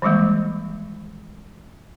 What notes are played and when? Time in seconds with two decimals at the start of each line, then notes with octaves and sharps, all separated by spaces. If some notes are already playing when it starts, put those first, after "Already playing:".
0.02 D#3 E3 G3 G#3 A#3